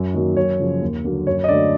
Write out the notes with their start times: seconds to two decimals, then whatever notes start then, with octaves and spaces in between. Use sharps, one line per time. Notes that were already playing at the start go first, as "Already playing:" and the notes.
Already playing: F#2
0.14 D#3 F#3 A#3
0.36 F#2 C#5
0.59 C#3 F3
0.82 D#2
1.04 D3 F#3 A#3
1.27 F#2 C#5
1.44 D#5
1.48 D3 F#3 A3 D5